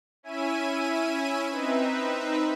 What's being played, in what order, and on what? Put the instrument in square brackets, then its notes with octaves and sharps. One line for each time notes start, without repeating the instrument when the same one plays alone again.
[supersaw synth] C#4 E4 E5 G#5 D#7
C4 D#4 B4 E5